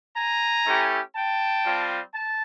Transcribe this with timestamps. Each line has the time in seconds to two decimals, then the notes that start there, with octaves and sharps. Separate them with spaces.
0.16 G#5 A#5
0.65 A3 C#4 E4 G4
1.15 G5 A5
1.66 G3 C4 F4
2.14 A5